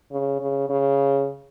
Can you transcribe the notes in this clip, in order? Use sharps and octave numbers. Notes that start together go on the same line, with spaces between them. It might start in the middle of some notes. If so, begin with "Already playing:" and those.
C#3
C#3
C#3